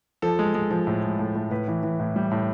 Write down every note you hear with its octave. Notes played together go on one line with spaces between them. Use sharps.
F3 A4
G#3
G#3
F3
A2
G#3
A2
A2
A2 B4
E3
E3
A2
G3
A2